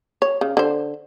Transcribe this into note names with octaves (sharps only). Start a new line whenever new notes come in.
C#5
C#3
D3 C5